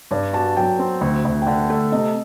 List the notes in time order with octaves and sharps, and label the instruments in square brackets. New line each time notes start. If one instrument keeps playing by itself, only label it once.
[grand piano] G2 [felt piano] D5
[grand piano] F#4 [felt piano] A5
[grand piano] F#3 [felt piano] G5
[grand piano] C4
D2
D2
[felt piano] G5
[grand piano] D3 [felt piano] F#5
[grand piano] A3
[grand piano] C3 [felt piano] D#5